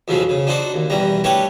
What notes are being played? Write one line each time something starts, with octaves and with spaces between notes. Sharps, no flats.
F2 G#2 B2 F3 F#3
C#3
D4 D#4 F#4 C5 D5
D#2
E2 B2 G3 A#5
G3 A3 D4 G4 B4 C#5